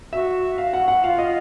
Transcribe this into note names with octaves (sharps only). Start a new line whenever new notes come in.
F#4 E5
F5
F#5
F#5
F4 F5
D#5